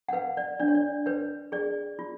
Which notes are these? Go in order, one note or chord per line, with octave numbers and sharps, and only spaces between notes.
F#5
B4 F5
D5
D4 D5
C#5
D5
B4 C#5
G#4 D5
F4